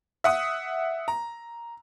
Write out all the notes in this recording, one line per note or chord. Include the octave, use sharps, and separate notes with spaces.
E5 F#5 D#6
A#5